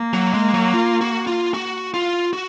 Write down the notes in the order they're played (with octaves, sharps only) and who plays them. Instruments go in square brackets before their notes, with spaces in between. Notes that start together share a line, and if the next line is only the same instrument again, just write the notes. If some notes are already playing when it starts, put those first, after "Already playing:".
Already playing: [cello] A#3
[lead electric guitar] F#3
G#3
F#3
F4
F#4
F4
F#4
F4
F#4